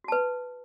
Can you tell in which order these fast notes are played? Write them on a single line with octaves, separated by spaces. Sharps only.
F#4 A5 B4